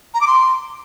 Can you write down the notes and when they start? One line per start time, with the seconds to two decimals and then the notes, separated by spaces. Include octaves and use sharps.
0.14 A#5
0.21 D6
0.27 C6